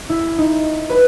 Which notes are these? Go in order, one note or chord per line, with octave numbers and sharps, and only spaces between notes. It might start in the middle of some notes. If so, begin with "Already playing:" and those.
E4
D#4
B4